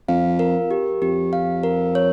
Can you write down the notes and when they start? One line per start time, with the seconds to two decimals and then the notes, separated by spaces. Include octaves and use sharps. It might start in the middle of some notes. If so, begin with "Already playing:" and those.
0.08 F2 F5
0.39 A#4
0.71 G4
1.02 F2 G4
1.33 F5
1.63 A#4
1.95 C#5